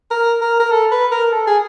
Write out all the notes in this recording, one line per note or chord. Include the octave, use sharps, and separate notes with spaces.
A#4
A#4
A#4
A4
B4
A#4
A4
G#4